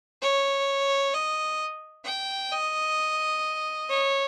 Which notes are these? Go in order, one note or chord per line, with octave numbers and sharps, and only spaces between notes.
C#5
D#5
G5
D#5
C#5